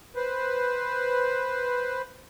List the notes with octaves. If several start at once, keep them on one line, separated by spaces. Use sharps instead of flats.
B4 C5